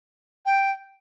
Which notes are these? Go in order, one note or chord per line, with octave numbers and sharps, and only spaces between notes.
G5